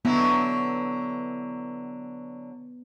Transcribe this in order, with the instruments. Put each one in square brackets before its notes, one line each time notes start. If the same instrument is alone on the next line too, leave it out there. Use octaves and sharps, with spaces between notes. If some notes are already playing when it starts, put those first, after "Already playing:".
[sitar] D3 F#3 E4 [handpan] B3